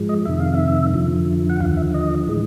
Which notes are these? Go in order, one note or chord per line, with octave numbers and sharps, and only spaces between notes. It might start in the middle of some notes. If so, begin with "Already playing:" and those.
Already playing: G#2 F3 G#3
D#5
F2 C3 D#3 E5
F5
E5
F2 D3 F3
F#5
D#2 D3 F3 F5
E5
D#5
A2 E3 G#3